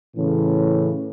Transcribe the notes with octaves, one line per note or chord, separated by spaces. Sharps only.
A2 C#3 E3